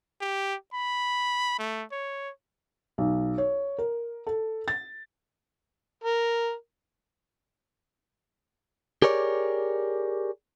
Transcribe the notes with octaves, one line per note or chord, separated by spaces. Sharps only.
G4
B5
A3
C#5
B1
C#5
A#4
A4
A6
A#4
G4 G#4 A#4 C#5 D5